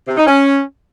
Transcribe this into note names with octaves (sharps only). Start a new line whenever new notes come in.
C3
D#4
C#4